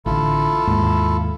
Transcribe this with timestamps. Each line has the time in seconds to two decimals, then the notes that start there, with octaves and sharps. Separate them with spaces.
0.06 A1 D3 E4 F4 A4
0.67 D#2 G#2